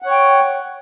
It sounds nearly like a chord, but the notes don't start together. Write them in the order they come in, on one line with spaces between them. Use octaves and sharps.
F#5 C#5 G5